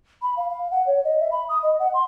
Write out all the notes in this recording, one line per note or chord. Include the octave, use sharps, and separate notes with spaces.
B5
F5
F5
F#5
C#5
D#5
E5
B5
D#6
D#5
F#5
C6